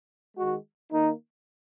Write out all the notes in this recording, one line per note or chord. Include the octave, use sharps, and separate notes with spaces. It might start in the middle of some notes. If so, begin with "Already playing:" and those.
D#3 G#3 F#4
D#3 A#3 D#4